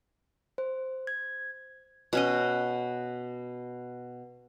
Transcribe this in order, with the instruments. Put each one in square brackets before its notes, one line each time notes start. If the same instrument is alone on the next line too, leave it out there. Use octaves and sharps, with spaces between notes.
[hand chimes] C5
G#6
[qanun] B2 C#4 D#5